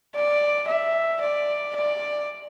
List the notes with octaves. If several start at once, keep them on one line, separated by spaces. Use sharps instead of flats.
D5
E5
D5
D5